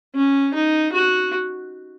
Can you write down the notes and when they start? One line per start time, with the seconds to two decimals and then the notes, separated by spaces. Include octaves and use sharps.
0.15 C#4
0.54 D#4
0.93 F#4